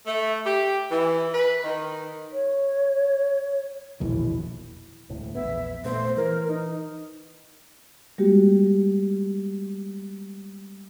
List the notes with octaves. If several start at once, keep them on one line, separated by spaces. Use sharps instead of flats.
A3
G4
E3
B4
D#3
C#5
E1 A#1 D#2 E4
E1 D2 A2
A#1 E2 B3 E5
A#2 A3 B3 C5
E3 A#4
D#4
G3 G#3 A#3 F#4 G4